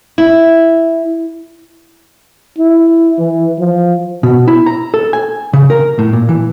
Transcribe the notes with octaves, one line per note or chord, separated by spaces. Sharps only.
E4
E4
E3
F3
B2
E4
A#5
A4
G#5
C#3
A#4
A2
A#2
E3